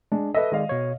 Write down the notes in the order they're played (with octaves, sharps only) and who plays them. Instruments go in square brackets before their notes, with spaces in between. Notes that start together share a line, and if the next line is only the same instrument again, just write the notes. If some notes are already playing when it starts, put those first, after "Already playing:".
[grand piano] G#3 [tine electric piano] D4
[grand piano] A4 D#5 [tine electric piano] B4 E5
[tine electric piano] D#3 G#3 D5 [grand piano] D#5 F5
[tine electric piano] B2 C#5